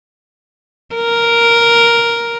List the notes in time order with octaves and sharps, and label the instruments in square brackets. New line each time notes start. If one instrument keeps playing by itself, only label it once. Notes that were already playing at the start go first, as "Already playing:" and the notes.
[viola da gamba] A#4